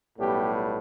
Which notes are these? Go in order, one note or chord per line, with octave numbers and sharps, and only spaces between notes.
B1 A2 G3 B3 G4